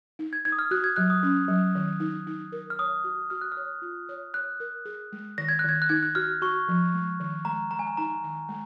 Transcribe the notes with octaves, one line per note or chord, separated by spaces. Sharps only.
D#4
G#6
D#4 G#6
D#6
F6
F#4 F#6
G#6
F#3 F#6
D#6
C#4
F#3
D#3
D#4
D#4
A#4
F6
C#5 D#6
F#4
F#4 F6
F#6
F6
C#5
F4
C#5
C#5 F#6
A#4
G#4
G#3
D#3 A#6
G#6
F#6
D#3 G#6
F#6
D#4 G#6
F#6
F#4 F6
F#4 C#6
F3
G#3
D#3
G#3 A#5
G#3 A#5
G#5
A#5
D#4 A#5
D#3
G#3